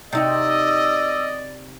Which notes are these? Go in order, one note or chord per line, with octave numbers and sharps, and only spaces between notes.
C3 D#4 F#4 D5 D#5 E6